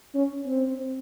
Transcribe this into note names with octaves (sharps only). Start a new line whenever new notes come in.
C#4
C4